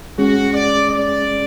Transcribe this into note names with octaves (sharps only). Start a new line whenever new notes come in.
G#3 C#4 F#4 G#4
D5
D5